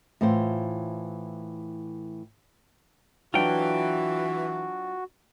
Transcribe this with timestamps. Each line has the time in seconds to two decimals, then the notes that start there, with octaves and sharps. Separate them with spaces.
0.21 A2 E3 F4 C5
3.34 E3 F#3 D4 F4 F#4 G5